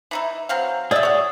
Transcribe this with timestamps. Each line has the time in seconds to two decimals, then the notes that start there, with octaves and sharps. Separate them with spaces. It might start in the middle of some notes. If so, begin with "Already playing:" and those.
0.11 E3 D#4 E4
0.49 F#3 C4 F5
0.91 G#4 D5 E5 G5 E6
1.03 F#4 C#5